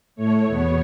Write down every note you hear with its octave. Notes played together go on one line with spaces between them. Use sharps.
A2 A3 C#5
E2 B2 B3